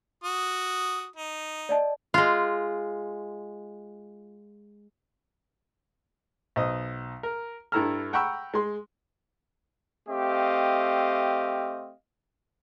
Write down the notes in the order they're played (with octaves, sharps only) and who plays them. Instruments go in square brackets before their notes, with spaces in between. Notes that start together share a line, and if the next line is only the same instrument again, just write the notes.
[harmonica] F#4 D#6
D#4
[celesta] D5 D#5 A5
[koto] G#3 F4
[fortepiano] B1 C5 D#5
A#4
G2 E4 A4 A#5 E6 F6
F#5 G5 A#5 B5 C#6 E6
G#3 C6
[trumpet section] A3 C4 G4 D#5 F5